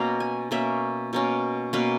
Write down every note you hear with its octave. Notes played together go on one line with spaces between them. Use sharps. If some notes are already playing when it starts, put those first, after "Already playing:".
Already playing: B2 A#3 C#4 A#5
G#5
B2 A#3 C#4 E5
B2 A#3 C#4
B2 A#3 C#4 B4